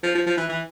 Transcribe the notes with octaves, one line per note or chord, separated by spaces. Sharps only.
F3
F3
F3
E3
E3